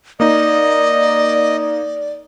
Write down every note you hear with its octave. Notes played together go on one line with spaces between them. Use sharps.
A#3 D#4 D5 D#5